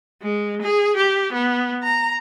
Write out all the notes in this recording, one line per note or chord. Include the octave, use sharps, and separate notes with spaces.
G#3
G#4
G4
B3
A#5